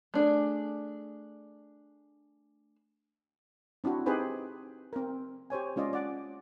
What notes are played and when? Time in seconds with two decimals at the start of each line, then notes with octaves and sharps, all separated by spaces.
0.14 A3 D4 G#4
3.84 C4 D4 E4 F#4
4.06 C4 D#4 G4 G#4 B4 C5
4.93 C4 A#4
5.50 G4 C5 C#5 G#5
5.76 G#3 C#4 F4 D5 D#5
5.93 D5 F#5